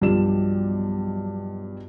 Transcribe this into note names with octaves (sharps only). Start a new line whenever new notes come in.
B1 G2 F3 G4 D5 E7